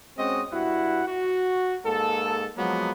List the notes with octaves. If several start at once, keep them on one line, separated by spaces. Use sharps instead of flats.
G#3 C4 C#4 F#4 D#5
G2 E4 F#4 F#5
F#4
G#2 A#3 A4
F3 F#3 G#3 A#3 B3